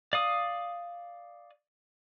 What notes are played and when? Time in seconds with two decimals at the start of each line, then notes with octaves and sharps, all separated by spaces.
0.13 D5 F5 D#6